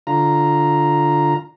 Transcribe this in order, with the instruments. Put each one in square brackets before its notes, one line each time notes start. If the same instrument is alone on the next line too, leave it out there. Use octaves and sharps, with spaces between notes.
[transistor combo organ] D3 F4 A#5